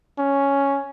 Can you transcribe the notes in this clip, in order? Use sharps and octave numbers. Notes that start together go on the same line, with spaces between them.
C#4